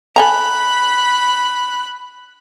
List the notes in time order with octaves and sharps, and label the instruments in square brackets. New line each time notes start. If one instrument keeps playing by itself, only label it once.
[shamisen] A4 G#5 A#5 [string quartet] B5 F#6